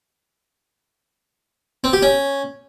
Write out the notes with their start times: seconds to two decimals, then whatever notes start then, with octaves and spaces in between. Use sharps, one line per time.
1.84 C4
1.93 G4
2.02 C#4